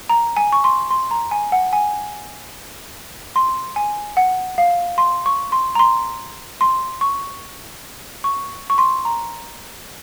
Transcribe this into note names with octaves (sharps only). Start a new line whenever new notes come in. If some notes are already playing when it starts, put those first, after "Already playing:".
A#5
G#5
C#6
C6
C6
A#5
G#5
F#5
G#5
C6
G#5
F#5
F5
C6
C#6
C6
A#5
C6
C6
C#6
C#6
C#6
C6
A#5